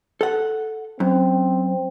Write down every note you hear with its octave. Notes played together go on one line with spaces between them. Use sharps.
A4 F#5
F#2 C4